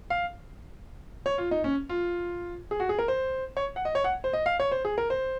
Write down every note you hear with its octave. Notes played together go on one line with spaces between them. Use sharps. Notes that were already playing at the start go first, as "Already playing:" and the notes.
F5
C#5
F4
D#4
C#4
F4
G#4
F#4
G#4
A#4
C5
C#5
F#5
D#5
C#5
F#5
C5
D#5
F5
C#5
C5
G#4
A#4
C5